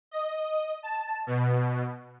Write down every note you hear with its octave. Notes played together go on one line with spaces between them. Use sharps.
D#5
A5
B2